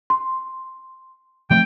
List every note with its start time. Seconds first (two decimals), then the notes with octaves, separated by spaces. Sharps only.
0.10 C6
1.50 F3 A3 C4 G5